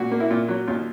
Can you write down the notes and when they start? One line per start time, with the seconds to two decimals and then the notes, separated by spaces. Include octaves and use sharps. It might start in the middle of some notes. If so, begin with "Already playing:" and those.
Already playing: A#2 F#4
0.12 A#3
0.20 E4
0.31 A#2 F4
0.48 F#3
0.67 D#2 F4